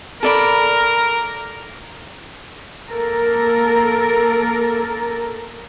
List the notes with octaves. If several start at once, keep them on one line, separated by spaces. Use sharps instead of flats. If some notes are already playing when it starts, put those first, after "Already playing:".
A4 A#4 D5 B5
A#3 A4 A#4